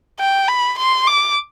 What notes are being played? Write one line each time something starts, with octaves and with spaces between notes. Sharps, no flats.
G5
B5
C6
D6